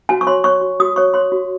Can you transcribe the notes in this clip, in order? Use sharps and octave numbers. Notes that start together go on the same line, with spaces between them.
F#4 G#5
C#6
C#5 C6
C#5 C#6
F#4
F#4 D#6
C#5 C#6
C#5 C6
F#4